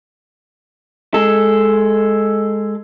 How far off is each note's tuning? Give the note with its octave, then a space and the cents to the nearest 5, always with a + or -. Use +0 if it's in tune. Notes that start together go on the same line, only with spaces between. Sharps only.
G#3 +0 A4 +0